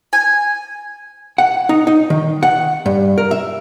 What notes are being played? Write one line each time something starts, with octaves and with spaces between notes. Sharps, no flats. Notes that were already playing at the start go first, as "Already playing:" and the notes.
G#5
F#5
D#4
D#4
D#3
F#5
G2
A#4
E5